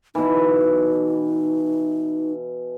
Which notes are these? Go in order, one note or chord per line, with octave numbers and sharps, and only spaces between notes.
B2 E3 D#4